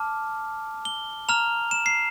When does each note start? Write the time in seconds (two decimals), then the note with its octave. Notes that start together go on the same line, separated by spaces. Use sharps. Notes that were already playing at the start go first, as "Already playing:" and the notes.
Already playing: A5 D6 F6
0.85 G7
1.29 A#5 F6 F7
1.71 E7
1.86 C7